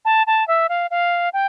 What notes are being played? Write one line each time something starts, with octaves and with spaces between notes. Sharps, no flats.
A5
A5
E5
F5
F5
G5